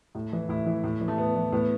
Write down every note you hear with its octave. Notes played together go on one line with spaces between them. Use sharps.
A2
E3
A2 E4
E3
A2
E3
A3
A2 B3
E3
A2 B3